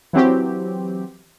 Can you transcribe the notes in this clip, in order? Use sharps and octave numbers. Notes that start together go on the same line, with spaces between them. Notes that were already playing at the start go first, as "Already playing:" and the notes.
E3 F#3 C4 G4